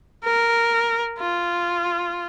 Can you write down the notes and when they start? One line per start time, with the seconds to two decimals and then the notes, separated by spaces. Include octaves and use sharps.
0.25 A#4
1.19 F4